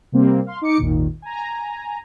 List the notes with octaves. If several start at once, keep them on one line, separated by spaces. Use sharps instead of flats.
C3 G3 A#3 C4
F5 C6
D#4 D6 C#7
G#1 D#2 A#2 D#3
G#5 A#5